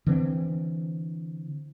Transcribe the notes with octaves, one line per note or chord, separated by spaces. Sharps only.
D3 E3 A#3 C4